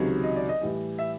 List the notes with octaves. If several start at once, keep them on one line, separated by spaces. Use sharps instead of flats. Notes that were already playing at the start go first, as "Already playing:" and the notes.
Already playing: C#2 C3 D#3 F#3
D#5
D5
D#5
A2 E3 G3
E5